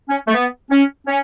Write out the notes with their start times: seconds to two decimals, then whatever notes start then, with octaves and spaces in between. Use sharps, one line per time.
0.09 C#4
0.28 A3
0.34 B3
0.71 C#4
1.07 C#4